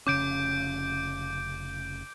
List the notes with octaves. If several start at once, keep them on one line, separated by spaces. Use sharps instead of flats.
F1 C#3 C#4 D6 G6 D7